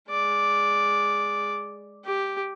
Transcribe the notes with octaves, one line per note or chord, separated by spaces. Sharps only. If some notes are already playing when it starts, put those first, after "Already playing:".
G#3 D5
G4